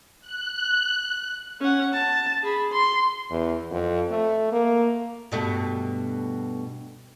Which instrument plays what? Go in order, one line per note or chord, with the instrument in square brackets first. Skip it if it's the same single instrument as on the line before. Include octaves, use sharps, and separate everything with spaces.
[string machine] F#6
[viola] C#4 F#5
A5
G#4 B5
C6
[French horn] E2
F2
A3
A#3
[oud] G2 B2 A3